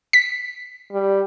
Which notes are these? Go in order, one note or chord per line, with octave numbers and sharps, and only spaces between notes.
B6
G3